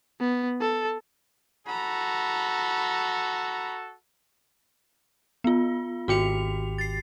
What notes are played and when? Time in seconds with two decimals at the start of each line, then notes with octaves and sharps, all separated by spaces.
0.20 B3
0.61 A4
1.67 F#4 A4 A#5 B5
5.44 B3 F4
6.08 G#1 F#4 G4 C#7 F7
6.78 A6 C7